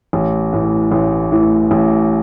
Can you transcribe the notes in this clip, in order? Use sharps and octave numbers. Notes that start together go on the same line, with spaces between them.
A1
A2 E3
A1
A2 E3
A1